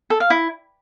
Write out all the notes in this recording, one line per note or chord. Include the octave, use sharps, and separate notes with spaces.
A4
F5
E4